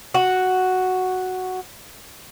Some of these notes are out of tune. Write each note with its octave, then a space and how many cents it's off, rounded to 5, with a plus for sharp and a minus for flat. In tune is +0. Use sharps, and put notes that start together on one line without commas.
F#4 +0